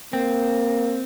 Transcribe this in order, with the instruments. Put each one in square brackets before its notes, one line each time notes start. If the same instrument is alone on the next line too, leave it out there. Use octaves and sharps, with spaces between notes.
[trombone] A#3 [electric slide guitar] C4